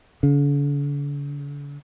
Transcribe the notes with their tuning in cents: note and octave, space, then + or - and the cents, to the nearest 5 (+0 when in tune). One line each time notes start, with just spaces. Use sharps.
D3 -45